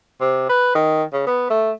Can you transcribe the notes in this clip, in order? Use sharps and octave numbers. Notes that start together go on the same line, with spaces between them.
C3
B4
D#3
C#3
B3
A3